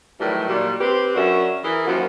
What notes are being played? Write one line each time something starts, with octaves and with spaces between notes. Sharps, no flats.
A2 D#3 E3 F#3 G3
A#2 D#3 F#3 G3
C4 G4 B4
F#2 C#4 D4 F#4 A#4 E5
E3 G#4 A#4
F#2 D#3 F3 A#3 F#4